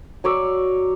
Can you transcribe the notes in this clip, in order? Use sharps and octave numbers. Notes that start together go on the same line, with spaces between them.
F#3 C#5 D5 E6